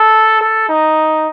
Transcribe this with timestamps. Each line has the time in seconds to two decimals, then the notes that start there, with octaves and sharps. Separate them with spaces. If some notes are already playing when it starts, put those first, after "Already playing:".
Already playing: A4
0.41 A4
0.69 D#4